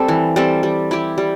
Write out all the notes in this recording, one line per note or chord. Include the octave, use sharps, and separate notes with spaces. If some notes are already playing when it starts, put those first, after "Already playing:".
Already playing: G3 C4 A4
E3
G3 C4 A4
G3
E4 G4
G3